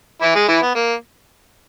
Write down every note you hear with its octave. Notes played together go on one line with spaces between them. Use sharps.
E3 E4
G#3 G#4
E3 E4
B3
A#3